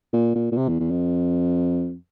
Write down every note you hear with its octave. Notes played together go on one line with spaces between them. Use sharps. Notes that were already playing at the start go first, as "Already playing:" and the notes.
A#2
A#2
A#2
C3
E2
E2
F2